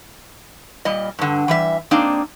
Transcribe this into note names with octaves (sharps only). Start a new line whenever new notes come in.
A#2 G3 D#5
G2 D3
E3 G3 E5
A#3 C4 D4 D#4